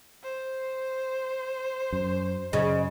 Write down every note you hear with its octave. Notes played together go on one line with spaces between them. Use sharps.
C5
F#2
F#2 C#3 D#5